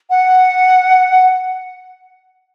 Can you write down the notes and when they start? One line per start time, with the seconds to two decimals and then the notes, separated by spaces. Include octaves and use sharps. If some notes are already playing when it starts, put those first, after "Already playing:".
0.10 F#5